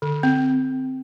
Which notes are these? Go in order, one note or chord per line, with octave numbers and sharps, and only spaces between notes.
D3
C4